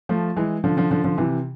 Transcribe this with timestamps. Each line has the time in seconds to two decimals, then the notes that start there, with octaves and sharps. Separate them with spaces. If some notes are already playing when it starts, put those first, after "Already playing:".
0.09 F3 A3
0.37 E3 G#3
0.64 D3 F3
0.77 D3 F3
0.91 D3 F3
1.04 D3 F3
1.18 C3 E3